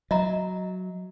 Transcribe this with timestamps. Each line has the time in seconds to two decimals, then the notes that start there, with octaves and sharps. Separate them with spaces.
0.11 F#3 D#5 E5 A#5